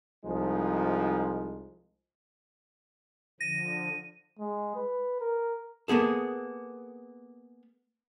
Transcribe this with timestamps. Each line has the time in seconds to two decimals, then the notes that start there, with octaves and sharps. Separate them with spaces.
0.24 C2 F3 G#3 D#4
3.40 D3 F3 A#6 D#7
4.39 G#3
4.75 B4
5.20 A#4
5.88 A#3 B3 G#4 A4